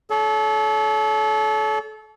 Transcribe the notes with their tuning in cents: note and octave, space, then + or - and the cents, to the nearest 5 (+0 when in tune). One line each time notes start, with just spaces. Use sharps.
A4 -30 C#5 +35